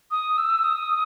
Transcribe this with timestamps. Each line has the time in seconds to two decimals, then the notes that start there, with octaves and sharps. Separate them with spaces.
0.11 D#6
0.38 E6
0.64 D#6